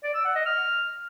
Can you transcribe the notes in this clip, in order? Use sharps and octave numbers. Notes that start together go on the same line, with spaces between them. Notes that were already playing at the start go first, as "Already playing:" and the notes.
D5
E6
F#5
D#5
F6